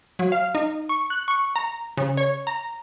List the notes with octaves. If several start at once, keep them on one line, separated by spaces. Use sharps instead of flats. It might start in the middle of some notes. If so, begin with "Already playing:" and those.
F#3
F5
D#4
C#6
F#6
C#6
A#5
C#3
C#5
A#5